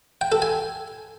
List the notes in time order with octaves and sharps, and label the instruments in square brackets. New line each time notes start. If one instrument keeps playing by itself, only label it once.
[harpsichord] G5
A4
G#5